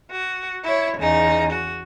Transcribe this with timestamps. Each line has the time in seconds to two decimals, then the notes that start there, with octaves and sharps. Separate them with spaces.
0.13 F#4
0.65 E4 C#5
0.99 E2 C#3 D#4
1.52 F#4